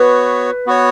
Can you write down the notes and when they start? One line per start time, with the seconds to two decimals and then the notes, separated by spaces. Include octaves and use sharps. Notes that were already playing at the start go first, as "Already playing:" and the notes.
Already playing: B3 F#4 B4 C#5
0.67 B3 F#4 C#5